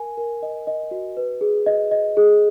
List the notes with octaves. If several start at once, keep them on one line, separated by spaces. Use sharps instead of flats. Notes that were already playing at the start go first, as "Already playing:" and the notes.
Already playing: A#4 G#5
A#4
D#5
D#5
F#4
B4
G#4
D#5
D#5
G#4